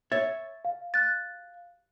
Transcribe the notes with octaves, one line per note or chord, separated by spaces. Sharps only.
C#5 E5 A6
F5
F#6 A6